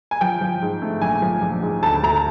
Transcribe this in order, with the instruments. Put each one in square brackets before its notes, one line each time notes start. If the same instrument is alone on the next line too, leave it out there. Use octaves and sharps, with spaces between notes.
[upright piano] G#5
F3 G5
F3
G#2
A3
A#1 G#5
F3
A#1
G#2
D2 A5
D2 A#5